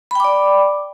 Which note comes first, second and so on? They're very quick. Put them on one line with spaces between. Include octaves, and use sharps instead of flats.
B5 G5 D6 D5